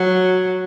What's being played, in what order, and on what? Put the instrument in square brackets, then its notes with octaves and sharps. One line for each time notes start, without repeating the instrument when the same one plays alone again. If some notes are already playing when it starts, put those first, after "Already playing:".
Already playing: [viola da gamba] F#3